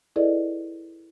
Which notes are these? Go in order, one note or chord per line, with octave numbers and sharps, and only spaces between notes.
E4 G#4 A4 B4 D5 D#5